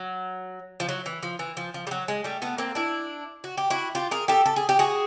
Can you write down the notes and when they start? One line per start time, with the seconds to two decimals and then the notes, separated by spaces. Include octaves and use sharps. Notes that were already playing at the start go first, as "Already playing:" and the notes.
Already playing: F#3
0.80 F3
0.89 F#3
1.06 E3
1.23 F3
1.39 E3
1.57 F3
1.74 F3
1.87 G3
1.91 F#3
2.08 G#3
2.24 G3 A3
2.42 A3 B3
2.58 A#3 C4
2.75 D4 E4
3.44 F#4
3.58 G4
3.70 E4 F#4
3.95 F4 G4
4.11 G#4 A#4
4.28 G4 A4
4.46 A4
4.56 G#4
4.69 G4
4.79 F#4 G#4